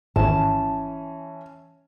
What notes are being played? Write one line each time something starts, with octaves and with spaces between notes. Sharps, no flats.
G#1 E3 C#4 A5